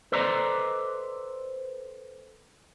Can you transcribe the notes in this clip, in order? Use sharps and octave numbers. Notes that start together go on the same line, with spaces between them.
A4 B4 C5 D5 D#5 A#5